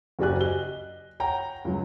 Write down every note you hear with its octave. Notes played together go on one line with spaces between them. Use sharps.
F#1 F#4 G4 D5 G#5 F#6
D#5 G7
C#5 F#5 G5 A#5
C#2 F#3